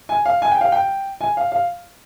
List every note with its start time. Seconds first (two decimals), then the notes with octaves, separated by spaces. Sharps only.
0.09 G#5
0.25 F5
0.42 G#5
0.51 G5
0.61 F5
0.72 G5
1.21 G#5
1.37 F5
1.52 F5